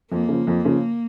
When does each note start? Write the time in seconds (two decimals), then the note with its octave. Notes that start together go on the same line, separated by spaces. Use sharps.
0.11 F2 A#3
0.29 C#3 F3
0.47 F2
0.65 C#3 F3